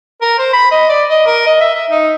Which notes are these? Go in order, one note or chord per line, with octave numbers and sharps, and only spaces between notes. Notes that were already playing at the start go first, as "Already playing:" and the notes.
A#4
C5
B5
D#5
D5
D#5
A#4
D#5
E5
E5
D#4